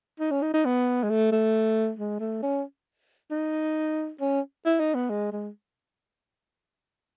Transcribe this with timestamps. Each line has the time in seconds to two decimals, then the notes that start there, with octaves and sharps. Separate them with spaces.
0.20 D#4
0.31 C#4
0.42 D#4
0.53 D#4
0.65 B3
1.03 G#3
1.10 A3
1.32 A3
1.99 G#3
2.20 A3
2.42 C#4
3.31 D#4
4.20 C#4
4.65 E4
4.79 D#4
4.94 B3
5.10 G#3
5.32 G#3